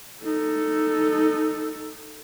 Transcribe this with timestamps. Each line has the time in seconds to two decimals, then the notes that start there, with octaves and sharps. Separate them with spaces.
0.24 D#4 A4